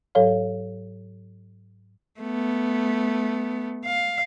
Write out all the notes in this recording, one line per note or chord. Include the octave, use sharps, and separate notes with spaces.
G#2 F#3 A4 C#5 F5
A3 B3
F5